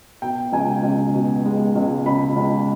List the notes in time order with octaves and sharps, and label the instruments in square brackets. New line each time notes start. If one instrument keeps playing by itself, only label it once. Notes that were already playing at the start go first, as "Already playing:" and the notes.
[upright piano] B2 G5
C#2 G#5
C#2
B2
G#3
C#2
C#2 B5
C#2